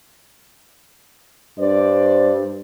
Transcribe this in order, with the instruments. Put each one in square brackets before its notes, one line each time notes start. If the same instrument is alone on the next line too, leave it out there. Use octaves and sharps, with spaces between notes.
[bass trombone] G2 [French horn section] C5 D5